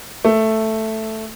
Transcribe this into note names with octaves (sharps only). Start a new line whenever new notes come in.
A3